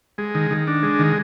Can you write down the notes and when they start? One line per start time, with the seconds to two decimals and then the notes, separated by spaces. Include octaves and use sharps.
0.18 G#3
0.35 D#3
0.51 D#3
0.67 D4
0.83 G#3
0.99 D#3